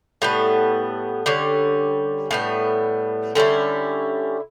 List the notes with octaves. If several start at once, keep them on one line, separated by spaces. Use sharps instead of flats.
A2 G3 B3
D3 G3 C#4
A2 G3 B3
D3 G3 C#4 E4